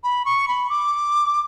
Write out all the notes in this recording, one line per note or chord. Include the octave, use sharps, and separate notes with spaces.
B5
C#6
B5
D6